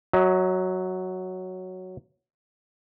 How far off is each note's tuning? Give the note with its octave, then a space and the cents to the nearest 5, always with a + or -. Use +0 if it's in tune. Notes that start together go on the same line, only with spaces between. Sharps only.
F#3 +0 D#5 +45